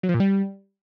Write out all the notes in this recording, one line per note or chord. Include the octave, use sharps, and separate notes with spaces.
F#3
F3
A#2
G3